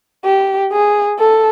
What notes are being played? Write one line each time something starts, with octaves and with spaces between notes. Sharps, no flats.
G4
G#4
A4